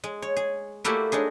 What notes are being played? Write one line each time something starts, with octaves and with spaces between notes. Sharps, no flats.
G#3
C#5
G#4
A3 A#3 E4 F#4 G4 D5
G#3 D4 D#4 G#4